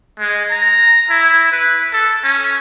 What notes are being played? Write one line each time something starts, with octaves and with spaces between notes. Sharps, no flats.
G#3
A#5
E4
B4
A4
C#4